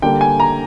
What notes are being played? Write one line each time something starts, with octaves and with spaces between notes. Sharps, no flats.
D3 G3 A#3 G5
G#5
A#5